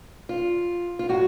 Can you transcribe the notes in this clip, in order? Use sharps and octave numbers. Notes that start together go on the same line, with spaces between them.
F4
F4
A2 F#3 F#4